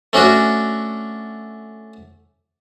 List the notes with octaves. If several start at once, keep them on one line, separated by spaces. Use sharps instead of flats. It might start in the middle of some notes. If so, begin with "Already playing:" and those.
A3 C#4 D4 F#4